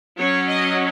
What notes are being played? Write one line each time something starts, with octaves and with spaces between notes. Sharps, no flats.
F#3 C#4 C#5
D#5